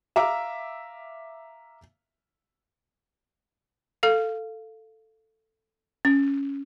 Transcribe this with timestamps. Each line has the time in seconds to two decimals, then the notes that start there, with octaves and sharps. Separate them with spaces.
0.16 E5 F5 A#5 D6 E6
4.03 A4 F5
6.05 C#4